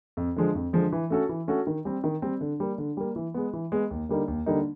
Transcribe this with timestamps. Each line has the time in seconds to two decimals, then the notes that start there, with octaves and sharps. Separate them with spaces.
0.17 F2
0.36 D3 F3 G#3
0.55 F2
0.73 D3 F3 G#3
0.92 E3
1.10 A3 C#4 F#4 A4
1.29 E3
1.48 A3 C#4 F#4 A4
1.67 D#3
1.85 G3 C4
2.04 D#3
2.22 G3 C4
2.41 D3
2.60 G3 A#3
2.78 D3
2.97 G3 A#3
3.16 E3
3.34 G#3 B3
3.53 E3
3.72 G#3 B3
3.91 D#2
4.09 D3 G3 A#3 D#4
4.28 D#2
4.46 D3 G3 A#3 D#4